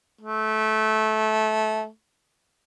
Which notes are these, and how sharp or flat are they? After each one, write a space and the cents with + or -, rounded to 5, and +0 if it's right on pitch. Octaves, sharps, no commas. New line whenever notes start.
A3 -20